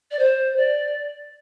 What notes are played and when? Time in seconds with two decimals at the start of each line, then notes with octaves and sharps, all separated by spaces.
0.11 D5
0.19 C5
0.57 D5